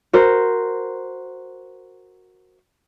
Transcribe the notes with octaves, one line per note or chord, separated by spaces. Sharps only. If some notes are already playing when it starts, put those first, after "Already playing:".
F#4 A#4 C5